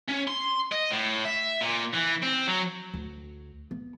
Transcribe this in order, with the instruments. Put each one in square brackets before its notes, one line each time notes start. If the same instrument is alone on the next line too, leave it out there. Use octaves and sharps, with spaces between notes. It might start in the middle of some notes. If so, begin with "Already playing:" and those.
[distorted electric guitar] C#4
C6
D#5
A2
E5
A#2
E3
C4
F#3
[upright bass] D2
B3